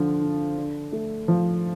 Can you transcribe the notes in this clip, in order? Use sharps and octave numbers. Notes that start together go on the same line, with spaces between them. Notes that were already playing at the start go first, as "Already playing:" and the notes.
Already playing: D3 F3
D3
D4
A3
F3